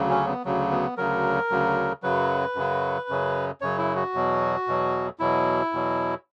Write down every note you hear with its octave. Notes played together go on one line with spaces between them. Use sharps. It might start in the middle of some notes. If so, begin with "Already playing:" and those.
Already playing: D2 C#3 F#3
C#4
B3
D2 C#3 F#3
B3
D2 C#3 F#3 A#4
D2 C#3 F#3
F#2 C#3 F#3 B4
F#2 C#3 F#3
F#2 C#3 F#3
F#2 C#3 F#3 C#5
E4
F#4
E2 B2 F#3
E2 B2 F#3
E2 B2 F#3 E4
E2 B2 F#3